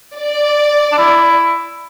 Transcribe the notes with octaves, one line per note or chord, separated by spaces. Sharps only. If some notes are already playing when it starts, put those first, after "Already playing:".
D5
D4
E4